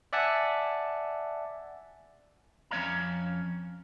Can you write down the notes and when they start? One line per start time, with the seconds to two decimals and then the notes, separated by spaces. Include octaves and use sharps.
0.13 D5 E5 F#5 G#5 A5
2.71 F2 C#4 C#5 D#5 F5 A#5